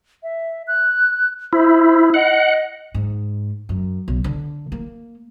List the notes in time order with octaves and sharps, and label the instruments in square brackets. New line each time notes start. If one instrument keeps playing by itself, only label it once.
[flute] E5
F#6
[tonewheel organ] E4 [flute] C5
[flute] D#5 [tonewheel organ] F#5
[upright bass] G#2
F#2
B1
D3
A#3